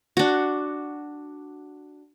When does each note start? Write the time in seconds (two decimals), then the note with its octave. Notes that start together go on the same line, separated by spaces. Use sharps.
0.17 D4 F#4